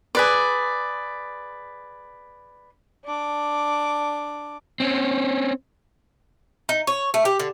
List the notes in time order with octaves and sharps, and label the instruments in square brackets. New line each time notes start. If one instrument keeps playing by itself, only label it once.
[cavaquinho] G#4 B4 D5
[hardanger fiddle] D4 D6
[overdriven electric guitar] C4 C#4
[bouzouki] D#4
C#5
A3
G4
D3